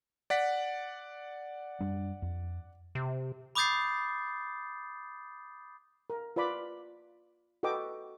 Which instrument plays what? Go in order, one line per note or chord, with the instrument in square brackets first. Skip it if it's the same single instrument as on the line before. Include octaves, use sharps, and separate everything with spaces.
[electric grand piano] D5 F#5 B6
[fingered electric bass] F#2 G3 D4
F2
[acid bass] C3
[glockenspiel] B5 D6 D#6 G6 A6 C7
[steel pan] A#4
F4 B4 D5 B5 D6
F#4 A4 B4 D#5 G5 D6